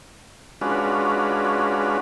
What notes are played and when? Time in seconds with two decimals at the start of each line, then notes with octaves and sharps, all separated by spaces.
0.61 G#3 C#4 D4 F4 F#4 B4